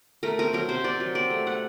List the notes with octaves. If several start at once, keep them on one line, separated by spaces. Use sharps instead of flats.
A3 A#4
C4 A#4
F#3 A#4
C3 C5
C3 D5
F#3
C4 D5
A3
A3 F#5